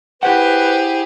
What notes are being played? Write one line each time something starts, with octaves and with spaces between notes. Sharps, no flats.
E4 G4 G#4 B4 C5 F#5